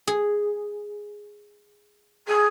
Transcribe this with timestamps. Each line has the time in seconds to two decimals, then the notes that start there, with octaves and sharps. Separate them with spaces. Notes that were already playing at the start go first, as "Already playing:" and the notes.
0.07 G#4
2.27 G#4